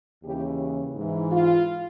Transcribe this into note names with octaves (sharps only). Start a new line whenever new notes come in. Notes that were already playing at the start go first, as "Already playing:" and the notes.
D#2 C#3 E3 G4
G#2 E3
F4